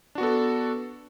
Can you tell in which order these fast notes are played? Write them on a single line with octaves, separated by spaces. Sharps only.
D4 F#4 B3 A4